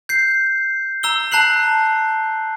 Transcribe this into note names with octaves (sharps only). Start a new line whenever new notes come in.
G6 C7
A#5 E6 G7
A5 A#5 F#6 C7 F#7